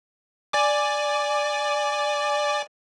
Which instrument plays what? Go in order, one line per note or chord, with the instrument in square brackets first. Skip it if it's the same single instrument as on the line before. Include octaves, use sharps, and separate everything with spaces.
[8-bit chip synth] D5 G#5 D6